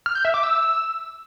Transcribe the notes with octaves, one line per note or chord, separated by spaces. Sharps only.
F6
G6
E5
D6
E6